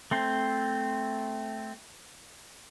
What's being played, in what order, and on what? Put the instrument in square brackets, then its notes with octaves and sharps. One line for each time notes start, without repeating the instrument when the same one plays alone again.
[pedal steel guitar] A3 C4 C5